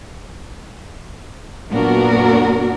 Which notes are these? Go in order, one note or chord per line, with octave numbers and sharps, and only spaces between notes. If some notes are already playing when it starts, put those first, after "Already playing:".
F#2 A#2 B3 D4 F#4 A#4